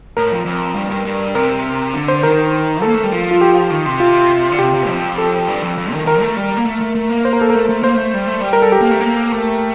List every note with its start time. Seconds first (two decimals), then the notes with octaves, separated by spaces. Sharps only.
0.17 A2 A#4
0.32 F2
0.46 F2
0.76 G2
0.90 G2
1.05 G2
1.35 C3 A#4
1.94 D3
2.08 C5
2.23 D#3 A#4
2.82 A#3 A4
2.94 A3
3.03 G3
3.12 F3
3.31 F4
3.41 G4
3.70 D#3
3.86 C3
4.00 F4
4.52 D3
4.59 C3 G4
4.74 C3
4.88 F2
5.18 A4
5.48 G2
5.63 F2
5.77 F2
5.93 D#3
6.06 D#3 A#4
6.21 A3
6.37 G3
6.57 A#3
6.65 A3
6.81 A3
6.95 A3
7.10 A#3
7.25 C5
7.33 A#4
7.41 A4
7.50 A#4
7.55 A3
7.69 A3
7.83 A#3 C5
7.95 A3
8.14 G3
8.27 A3
8.40 G3
8.53 A#4
8.62 A4
8.72 G4
8.81 A#3
8.91 A3
9.00 A#3
9.32 A3